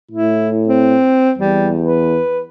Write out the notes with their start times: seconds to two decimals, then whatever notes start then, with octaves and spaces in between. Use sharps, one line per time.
0.11 A2 E4
0.68 C4
1.38 E2 G3
1.82 B4